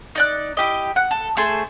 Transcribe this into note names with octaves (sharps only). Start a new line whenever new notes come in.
D#4 D5 F#6
E4 G4 D#5
F#5
A4
A3 G#4 C5 A5